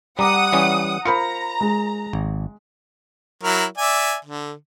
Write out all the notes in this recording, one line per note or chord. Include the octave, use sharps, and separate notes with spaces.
G3 F#5 A#5 D6 D#6
E3 G3 C#4
F4 A#4 C5 A#5 B5 C#7
G#3
G#1
F#3 E4 A#4
D5 E5 G#5
D3